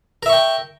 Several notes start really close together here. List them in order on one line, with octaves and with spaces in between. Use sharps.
A#4 E5 C#6 G5